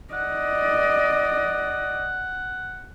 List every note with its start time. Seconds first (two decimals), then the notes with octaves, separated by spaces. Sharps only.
0.13 D5 D#5 F#5